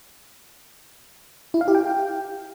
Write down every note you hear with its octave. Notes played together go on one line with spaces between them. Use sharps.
E4
F5
G4
G5